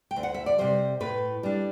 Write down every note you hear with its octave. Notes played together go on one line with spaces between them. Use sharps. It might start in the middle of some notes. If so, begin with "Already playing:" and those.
G5
D2
F#5
E5
D5
C3 G3 C5
A2 B4
G3 D4